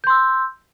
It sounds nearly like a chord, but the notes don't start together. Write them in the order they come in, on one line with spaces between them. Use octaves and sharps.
G6 C6 E6